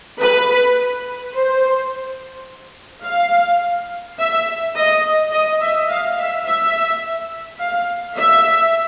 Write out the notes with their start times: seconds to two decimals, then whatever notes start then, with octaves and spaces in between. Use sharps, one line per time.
0.20 B4
1.34 C5
3.05 F5
4.18 E5
4.76 D#5
5.32 D#5
5.61 E5
5.89 F5
6.18 E5
6.47 E5
7.60 F5
8.18 E5